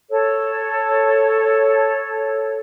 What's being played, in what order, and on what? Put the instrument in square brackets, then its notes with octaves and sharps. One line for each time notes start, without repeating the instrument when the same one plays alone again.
[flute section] A4 C#5